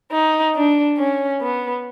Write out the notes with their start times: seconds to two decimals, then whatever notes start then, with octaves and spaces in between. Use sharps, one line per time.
0.12 D#4
0.55 D4
0.98 C#4
1.40 B3